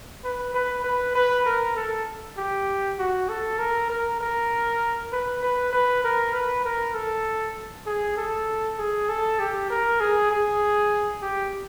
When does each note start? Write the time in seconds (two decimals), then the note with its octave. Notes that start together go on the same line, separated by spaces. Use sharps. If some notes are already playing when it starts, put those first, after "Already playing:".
0.24 B4
0.54 B4
0.84 B4
1.15 B4
1.46 A#4
1.76 A4
2.37 G4
2.99 F#4
3.29 A4
3.59 A#4
3.90 A#4
4.21 A#4
5.12 B4
5.42 B4
5.73 B4
6.04 A#4
6.34 B4
6.65 A#4
6.94 A4
7.86 G#4
8.17 A4
8.79 G#4
9.09 A4
9.39 G4
9.70 A#4
10.01 G#4
10.31 G#4
11.22 G4